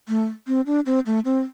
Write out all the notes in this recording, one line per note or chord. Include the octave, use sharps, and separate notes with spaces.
A3
C4
D4
C4
A3
C4